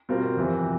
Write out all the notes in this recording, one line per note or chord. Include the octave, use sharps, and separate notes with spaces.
B2 G3 C4 F4 A#4
F2 C3 E3